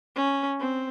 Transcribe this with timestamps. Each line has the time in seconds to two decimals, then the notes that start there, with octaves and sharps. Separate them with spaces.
0.16 C#4
0.60 C4